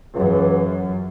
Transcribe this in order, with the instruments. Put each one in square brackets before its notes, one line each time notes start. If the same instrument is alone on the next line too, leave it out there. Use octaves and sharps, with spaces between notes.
[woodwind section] C#2 C#3 E3 [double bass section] F#2